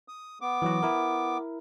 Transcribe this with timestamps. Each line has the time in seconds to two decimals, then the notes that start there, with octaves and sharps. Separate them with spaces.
0.08 D#6
0.41 B3 D6
0.62 E3 F#3 F#4
0.83 E4 A#4